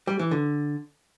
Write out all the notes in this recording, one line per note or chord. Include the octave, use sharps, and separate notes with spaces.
G3
E3
D3